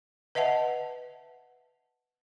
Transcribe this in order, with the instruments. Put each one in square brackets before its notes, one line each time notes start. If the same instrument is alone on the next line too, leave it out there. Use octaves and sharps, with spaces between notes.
[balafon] B4 D#5 E5 F#5 A5